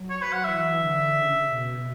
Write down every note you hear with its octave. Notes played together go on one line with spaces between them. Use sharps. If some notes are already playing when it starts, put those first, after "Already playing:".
Already playing: F#3
C#5
B4
F#5
E3 E5
D3
C#3
B2